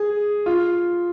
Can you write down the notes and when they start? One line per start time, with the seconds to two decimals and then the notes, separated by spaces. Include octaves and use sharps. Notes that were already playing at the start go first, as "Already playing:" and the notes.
Already playing: G#4
0.46 F4